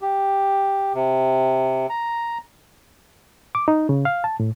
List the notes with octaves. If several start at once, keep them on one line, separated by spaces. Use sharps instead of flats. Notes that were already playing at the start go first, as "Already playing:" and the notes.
G4
C3
A#5
D6
D#4
C#3
F5
A5
A2